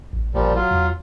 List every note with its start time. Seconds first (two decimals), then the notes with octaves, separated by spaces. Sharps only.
0.13 A1
0.34 A1 A#2 F3 G3
0.56 F#3 F4
0.71 E2